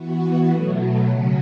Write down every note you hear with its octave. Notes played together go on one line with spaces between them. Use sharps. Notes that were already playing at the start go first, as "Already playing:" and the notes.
Already playing: E3 B3 F#4
B2 F#3 A3
C#3 F#3 C#4